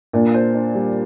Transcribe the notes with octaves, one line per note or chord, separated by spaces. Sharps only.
A#2 D4
C5
D4
G3